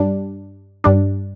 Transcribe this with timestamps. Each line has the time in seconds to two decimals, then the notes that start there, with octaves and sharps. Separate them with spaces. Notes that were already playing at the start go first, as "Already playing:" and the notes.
Already playing: G2 G3 D4
0.84 G2 G3 D4